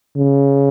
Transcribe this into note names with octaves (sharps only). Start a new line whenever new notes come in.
C#3